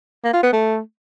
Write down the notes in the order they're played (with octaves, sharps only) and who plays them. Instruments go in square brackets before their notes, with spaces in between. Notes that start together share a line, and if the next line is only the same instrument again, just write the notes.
[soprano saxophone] A#3
F4
B3
A3